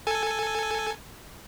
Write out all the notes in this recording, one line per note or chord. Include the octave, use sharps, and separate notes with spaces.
A4 G#5